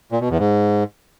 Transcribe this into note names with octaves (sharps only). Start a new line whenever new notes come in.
A#2
B2
E2
G#2